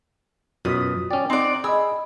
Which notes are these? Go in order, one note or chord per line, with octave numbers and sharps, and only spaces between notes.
F#2 B2 F4 D#6 B6
C#4 D5 G5 D6
C4 D#4 D5 F#5
G#4 D#5 B5 E6